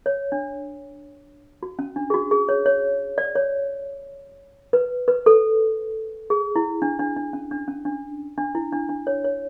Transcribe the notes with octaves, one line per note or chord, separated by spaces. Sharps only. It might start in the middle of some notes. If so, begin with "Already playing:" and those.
C#5
D4
F#4
C#4
D4
G#4
F#4
G#4
C#5
C#5
D5
C#5
B4
B4
A4
G#4
E4
D4
D4
D4
C#4
D4
C#4
D4
D4
E4
D4
D4
C#5
C#5